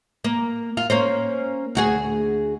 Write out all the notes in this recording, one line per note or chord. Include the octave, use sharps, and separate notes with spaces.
A#3
F4
A#3 C#4 C5
D2 F#4 G#4